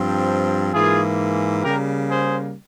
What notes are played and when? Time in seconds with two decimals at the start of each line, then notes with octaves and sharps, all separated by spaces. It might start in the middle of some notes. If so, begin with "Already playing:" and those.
Already playing: G2 F3 C4
0.73 G#2 E3 A#3 F4 G#4
1.63 C#3 G3 A#3 G4 A#4
2.09 G#4 C5